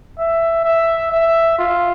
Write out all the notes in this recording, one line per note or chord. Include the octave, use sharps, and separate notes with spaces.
E5
E5
E5
F4